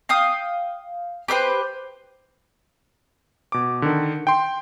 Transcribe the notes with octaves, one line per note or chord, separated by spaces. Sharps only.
F5 G5 D#6
G4 B4 C5 G5
B2 D6
D3 D#3
G5 C6